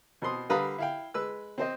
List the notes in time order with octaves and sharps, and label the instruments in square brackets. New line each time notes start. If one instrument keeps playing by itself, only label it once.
[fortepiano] B2 C4 C6 D#6
D3 G3 B4 F5 A#5 D#6
E4 F5 G5
G#3 B4 E6
C4 C5 D#5